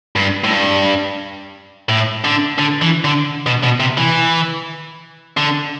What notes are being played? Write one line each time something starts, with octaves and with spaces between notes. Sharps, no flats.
G2
A2
G2
A2
D3
D3
E3
D3
B2
B2
C3
E3
D3